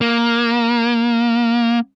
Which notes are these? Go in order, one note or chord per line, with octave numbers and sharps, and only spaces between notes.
A#3